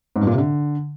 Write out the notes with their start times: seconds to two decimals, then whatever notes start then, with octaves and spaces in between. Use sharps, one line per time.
0.16 G#2
0.21 G2
0.27 A#2
0.32 C3
0.38 D3